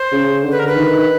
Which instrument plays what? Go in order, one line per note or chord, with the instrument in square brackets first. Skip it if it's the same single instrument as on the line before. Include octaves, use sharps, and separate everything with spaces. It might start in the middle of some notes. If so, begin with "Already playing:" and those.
Already playing: [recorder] C5
[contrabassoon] C#3
D3
[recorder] B4
A#4
B4
[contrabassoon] D#3